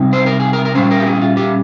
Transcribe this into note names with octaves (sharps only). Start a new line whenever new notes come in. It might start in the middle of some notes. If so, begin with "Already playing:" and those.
Already playing: C3 G3 C4 D#4
C5
A#4
G#4
A#4
A#4
A#2 G3 C#4 C5
A#4
G4
G#4
F4
G4